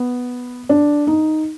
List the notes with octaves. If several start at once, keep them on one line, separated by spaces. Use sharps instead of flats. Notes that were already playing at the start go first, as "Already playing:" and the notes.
Already playing: B3
D4
D#4